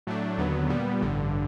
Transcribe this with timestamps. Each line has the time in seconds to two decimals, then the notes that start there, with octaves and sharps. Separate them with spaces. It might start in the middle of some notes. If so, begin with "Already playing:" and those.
0.07 A2 F#3 A3 D4
0.38 D#2 D3 F#3 B3
0.69 A#2 G3 B3
1.01 A1 G2 D3